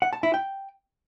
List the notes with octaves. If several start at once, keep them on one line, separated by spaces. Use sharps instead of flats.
F#5
A5
E4
G5